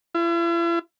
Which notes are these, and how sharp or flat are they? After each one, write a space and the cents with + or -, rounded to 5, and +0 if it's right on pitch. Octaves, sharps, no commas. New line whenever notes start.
E4 +45